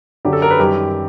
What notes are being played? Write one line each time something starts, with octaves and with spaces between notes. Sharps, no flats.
F#2 D3 F#3 G4
A4
A#4
B4
F#2 D#3 G3 G4